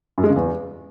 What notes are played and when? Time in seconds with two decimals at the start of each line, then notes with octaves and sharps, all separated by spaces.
0.18 F#2
0.24 G#3
0.30 C#3
0.36 E2